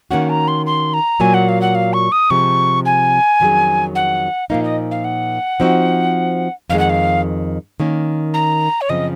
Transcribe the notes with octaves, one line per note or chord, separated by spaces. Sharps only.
D#3 A#3 C#4 F#4 F#5
A#5
C6
C6
A#5
A#2 F#3 A#3 G#5
F#5
F5
F#5
F5
C#6
D#6
C3 F3 G#3 C#6
G#5
F2 D#3 F#3 C#4 G#4
F#5
A#2 F3 A#3 D#4 F5
D#5
F5
F#5
F3 C4 D#4 F#4
F2 D#3 G#3 F5
F#5
F5
D#3 A#3 C#4
A#5
C#5
F#2 C#3 F3 C4 D#5